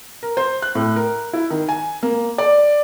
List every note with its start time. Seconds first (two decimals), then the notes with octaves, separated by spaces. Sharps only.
0.23 A#4
0.37 C5
0.62 F#6
0.75 A2
0.96 A#4
1.33 E4
1.50 D#3
1.69 G#5
2.03 A#3
2.38 D5